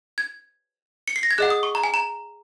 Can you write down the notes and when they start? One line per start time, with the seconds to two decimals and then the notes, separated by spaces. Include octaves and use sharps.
0.18 G#6
1.08 C#7
1.16 C7
1.23 A#6
1.31 G#6
1.38 G#4 D#5 F#5 F#6
1.50 D#6
1.63 C#6
1.75 A#5
1.84 G#5
1.94 A#5